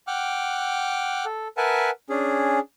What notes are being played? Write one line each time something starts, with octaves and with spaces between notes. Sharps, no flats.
F#5 G5 D6 F6 F#6
A4
A#4 B4 E5 F#5 G#5 A5
C#4 D4 G#4